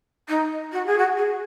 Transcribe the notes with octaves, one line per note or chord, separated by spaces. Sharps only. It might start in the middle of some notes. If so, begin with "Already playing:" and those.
D#4
F#4
G#4
F#4
G#4